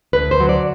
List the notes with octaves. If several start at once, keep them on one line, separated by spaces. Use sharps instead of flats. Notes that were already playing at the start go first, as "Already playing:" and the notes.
D2 B4
C5
F#3
D5